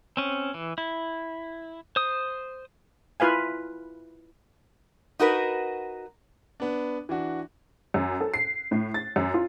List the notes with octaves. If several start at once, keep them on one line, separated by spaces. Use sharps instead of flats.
C4 C#4
E3
E4
C5 D#6
E4 F4 B4 F5 G#5
D#4 F#4 A#4 B4
B3 D4
E3 D4 F#4
F#2
A4
C7
A2
A6
F#2
F4